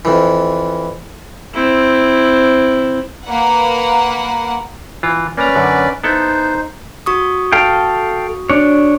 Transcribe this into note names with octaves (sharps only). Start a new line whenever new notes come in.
F2 E3
C4 E4
A#3 B4 F#5
E3 F4
A#3 C#4 B4 D5 A#5
F#2 D3
B3 D#4 E4 A4 C5
F#4 C#6 D#6
A4 F5 G5
D4 C#5